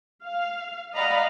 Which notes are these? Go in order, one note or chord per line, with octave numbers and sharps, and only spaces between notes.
F5
D5 D#5 F5 F#5 A#5 B5